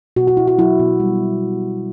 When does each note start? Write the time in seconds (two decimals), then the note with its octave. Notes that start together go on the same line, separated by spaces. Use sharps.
0.16 B2 F#4
0.27 F#4
0.37 B2 E4
0.48 F#4
0.58 F#3 E4
0.80 B2
1.00 G3